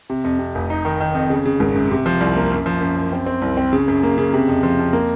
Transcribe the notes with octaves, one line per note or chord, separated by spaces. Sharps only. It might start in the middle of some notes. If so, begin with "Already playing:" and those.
C3
F2
C3
F1
D#4
D#3
D#3
F2
C#3
C#3
G#1
F#2
C3
F3
C2
A#3
F#2
F3
F#2
F#2
C4
C4
C2
C4
C#3
F#2
A#3
C#3
C3
F2
F3
F2
A#3